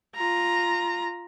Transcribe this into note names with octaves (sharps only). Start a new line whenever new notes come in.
F4 A#5